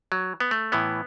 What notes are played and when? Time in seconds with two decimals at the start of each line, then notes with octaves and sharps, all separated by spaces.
0.12 F#3
0.40 B3
0.51 A3
0.72 A2 E3 B3